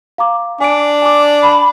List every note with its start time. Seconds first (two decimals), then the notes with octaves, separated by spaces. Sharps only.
0.18 F5 A#5 D6
0.61 D4 G#5 D7
1.02 G#5 D6
1.43 B5